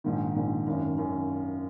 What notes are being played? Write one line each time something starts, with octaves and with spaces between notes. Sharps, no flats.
A#1 G#2 D#3
A#1 G#2 D#3
G#1 F#2 D#3
F#2 D#3